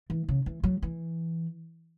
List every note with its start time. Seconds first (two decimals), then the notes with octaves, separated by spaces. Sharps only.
0.10 E3
0.29 C#3
0.46 E3
0.64 F#3
0.82 E3